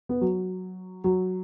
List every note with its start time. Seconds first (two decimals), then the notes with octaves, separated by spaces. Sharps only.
0.09 B3
0.21 F#3
1.04 F#3